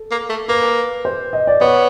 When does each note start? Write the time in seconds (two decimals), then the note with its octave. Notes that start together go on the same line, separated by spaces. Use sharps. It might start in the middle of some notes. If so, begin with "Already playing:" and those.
Already playing: A4
0.11 A#3
0.29 A3
0.48 A#3 B4
1.05 C5
1.33 D#5
1.47 D5
1.61 B3 C#5